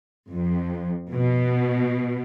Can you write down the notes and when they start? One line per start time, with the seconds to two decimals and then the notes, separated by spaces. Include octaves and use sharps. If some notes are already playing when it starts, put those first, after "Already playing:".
0.30 F2
1.12 B2